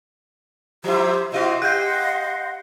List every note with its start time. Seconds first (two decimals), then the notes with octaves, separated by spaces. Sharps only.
0.84 F3 E4 G4 C5 E5
1.32 C3 E4 F#4 C5 D#5
1.62 G4 D#5 F5 F#5 C6 F#6 G6